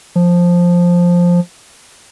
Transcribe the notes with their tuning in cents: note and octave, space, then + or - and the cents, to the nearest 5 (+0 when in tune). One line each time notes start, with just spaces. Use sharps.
F3 +5